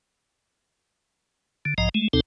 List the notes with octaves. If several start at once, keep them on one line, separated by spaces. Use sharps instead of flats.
D3
B1 G#2 F3 D#5 A#5
G#3 A3
D2 C3 C4 D#4 A4